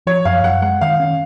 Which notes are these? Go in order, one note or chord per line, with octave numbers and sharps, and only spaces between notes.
F3 C#5
F#2 F5
F#2 F#5
G#3 F#5
D#3 F5
C#4